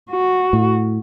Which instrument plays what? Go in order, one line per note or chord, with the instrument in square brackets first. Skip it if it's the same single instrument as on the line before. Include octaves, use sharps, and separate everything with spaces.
[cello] F#4
[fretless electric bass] A2